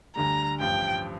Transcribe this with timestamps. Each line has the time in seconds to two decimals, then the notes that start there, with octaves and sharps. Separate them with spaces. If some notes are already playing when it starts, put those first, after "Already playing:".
0.16 D2 D3 G3 A#5
0.60 A1 G2 F3 G5